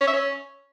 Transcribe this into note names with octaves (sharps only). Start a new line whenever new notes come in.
C#4
E5
C#4